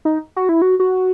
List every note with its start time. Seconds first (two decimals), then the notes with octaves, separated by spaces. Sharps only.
0.05 D#4
0.36 F#4
0.49 E4
0.62 F#4
0.80 F#4